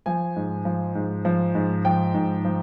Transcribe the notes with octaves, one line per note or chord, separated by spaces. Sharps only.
F3 G#5
G#2
F3
G#2
F3
G#2
F3 G5
G#2
F3